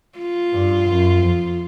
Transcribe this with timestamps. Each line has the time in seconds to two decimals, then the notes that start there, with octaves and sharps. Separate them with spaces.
0.18 F4
0.53 G2
0.88 F#2
1.22 F2